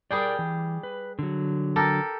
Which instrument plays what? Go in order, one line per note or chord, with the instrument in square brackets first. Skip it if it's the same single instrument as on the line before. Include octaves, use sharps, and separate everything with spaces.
[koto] G3 G#4 G5 [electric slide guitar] A#4 D5
[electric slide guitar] E3
B4
D3 F#3
[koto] G4 A4 A#4